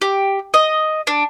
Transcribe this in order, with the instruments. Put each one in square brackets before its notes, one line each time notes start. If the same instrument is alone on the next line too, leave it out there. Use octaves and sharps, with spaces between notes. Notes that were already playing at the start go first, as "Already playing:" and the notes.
[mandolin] G4
D#5
D4